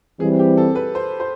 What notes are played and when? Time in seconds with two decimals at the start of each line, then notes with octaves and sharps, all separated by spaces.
0.20 E3 G3 C4 G#4
0.39 G4
0.57 A4
0.75 B4
0.95 C5
1.20 C5